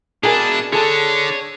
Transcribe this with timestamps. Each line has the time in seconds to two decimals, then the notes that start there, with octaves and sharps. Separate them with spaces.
0.23 B2 D4 E4 G#4 A#4 G#5
0.73 D3 D4 G#4 A4 C#5